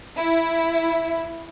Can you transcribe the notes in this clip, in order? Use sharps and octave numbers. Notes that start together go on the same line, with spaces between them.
E4